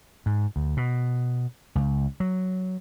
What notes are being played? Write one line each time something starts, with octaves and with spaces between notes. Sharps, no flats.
G#2
D2
B2
C#2
F#3